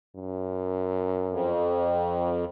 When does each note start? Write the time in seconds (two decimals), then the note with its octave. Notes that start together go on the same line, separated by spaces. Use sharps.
0.16 F#2
1.30 F2